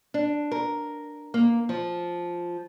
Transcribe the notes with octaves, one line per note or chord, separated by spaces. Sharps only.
D4
A#4
A#3
F3